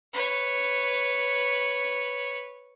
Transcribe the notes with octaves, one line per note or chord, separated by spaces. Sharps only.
B4 C#5